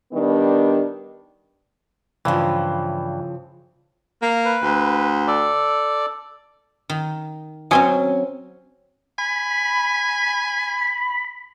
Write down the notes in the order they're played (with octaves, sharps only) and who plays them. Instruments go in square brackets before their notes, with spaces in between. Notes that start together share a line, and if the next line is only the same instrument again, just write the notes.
[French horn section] D#3 G3 B3 D4
[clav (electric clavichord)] G2 E3 [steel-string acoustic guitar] C#3 F3
[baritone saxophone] A#3
[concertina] B4
[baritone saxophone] D2
[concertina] A4 D5
[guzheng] D#3
[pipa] B2 D#5 G#5 [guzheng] F#3 C4 C#4
[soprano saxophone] G#5 [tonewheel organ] B5